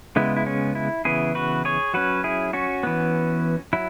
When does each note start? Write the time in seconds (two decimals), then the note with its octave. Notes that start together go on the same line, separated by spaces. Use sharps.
0.16 C#3 G#3 B3 E4
0.36 E4
0.46 C#4
0.75 E4
1.05 C#3 E3 B3 E4 G#4
1.35 F#4 B4
1.65 G#4 C#5
1.94 F#3 C#4 F#4 B4
2.24 E4 G#4
2.53 C#4 F#4
2.83 E3 B3
3.73 F#3 E4